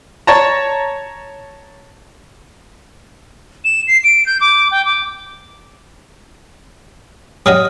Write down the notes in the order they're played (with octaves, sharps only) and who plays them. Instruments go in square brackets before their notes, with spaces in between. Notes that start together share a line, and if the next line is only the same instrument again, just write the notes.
[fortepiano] C#5 A5 A#5
[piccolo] E7
C7
D7
G6
D6
G5
D6
[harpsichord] F#3 G3 D#5 [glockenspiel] D#6 F6